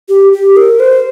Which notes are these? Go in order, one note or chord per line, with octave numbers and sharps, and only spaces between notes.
G4
G4
A#4
C5